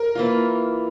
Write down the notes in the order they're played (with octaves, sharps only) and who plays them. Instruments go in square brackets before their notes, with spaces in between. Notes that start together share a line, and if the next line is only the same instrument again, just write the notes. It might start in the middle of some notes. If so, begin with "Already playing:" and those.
Already playing: [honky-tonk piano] A#4
[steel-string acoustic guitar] E3 A#3 F4